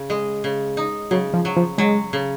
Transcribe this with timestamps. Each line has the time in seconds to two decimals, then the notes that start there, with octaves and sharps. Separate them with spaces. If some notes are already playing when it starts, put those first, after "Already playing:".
Already playing: C#3
0.10 G#3
0.44 C#3
0.77 D#4
1.11 C#3 F#3
1.34 F3
1.45 F#3
1.57 F3
1.78 F#3 G#3
2.13 C#3